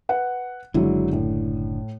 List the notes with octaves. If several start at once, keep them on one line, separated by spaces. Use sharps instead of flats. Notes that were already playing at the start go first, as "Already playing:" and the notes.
B4 F#5
F#1 D3 F#3 G#3 E4
A2